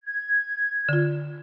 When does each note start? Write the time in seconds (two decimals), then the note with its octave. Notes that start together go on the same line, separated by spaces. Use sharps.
0.05 G#6
0.89 D3 F4